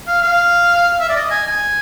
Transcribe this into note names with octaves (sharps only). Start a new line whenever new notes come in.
F5
F5
E5
D5
D#5
G#5
G#5